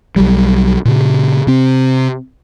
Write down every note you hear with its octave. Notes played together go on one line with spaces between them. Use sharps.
B1 F#3 G3
A#2 C#3
C3 C4